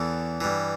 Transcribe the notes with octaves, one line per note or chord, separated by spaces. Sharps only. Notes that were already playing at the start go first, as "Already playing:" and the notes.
Already playing: E2 E3 A4
G2 E3